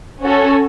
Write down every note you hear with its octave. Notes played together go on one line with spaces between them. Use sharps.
C#4 F#4 A4 C#5